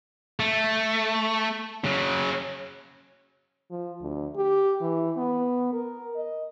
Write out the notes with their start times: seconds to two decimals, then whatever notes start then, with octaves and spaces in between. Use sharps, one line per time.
0.40 A3
1.84 C#3 F#3
3.70 F3
4.02 D2
4.36 G4
4.81 E3
5.17 B3
5.73 A#4
6.16 D#5